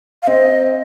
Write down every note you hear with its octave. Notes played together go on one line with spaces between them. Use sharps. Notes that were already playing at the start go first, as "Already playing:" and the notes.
F5
C4 D#5